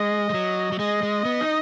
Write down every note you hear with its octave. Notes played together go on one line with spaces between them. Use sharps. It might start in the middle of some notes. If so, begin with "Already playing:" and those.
Already playing: G#3 D#5
G#3
F#3
F#3
G#3 D#5
G#3
B3
D#4